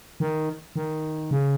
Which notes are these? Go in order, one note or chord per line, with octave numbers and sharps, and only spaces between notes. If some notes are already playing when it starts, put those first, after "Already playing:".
D#3
D#3
C#3